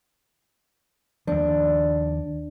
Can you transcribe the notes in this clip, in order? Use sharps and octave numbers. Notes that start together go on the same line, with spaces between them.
D#2 F3 D4